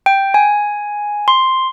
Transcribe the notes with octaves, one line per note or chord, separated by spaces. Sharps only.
G5
G#5
C6